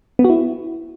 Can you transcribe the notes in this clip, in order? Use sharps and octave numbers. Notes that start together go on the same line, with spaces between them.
B3
F#4
E4